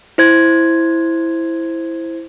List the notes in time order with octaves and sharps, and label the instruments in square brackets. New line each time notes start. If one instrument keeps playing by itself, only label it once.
[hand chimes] E4 C5 G#6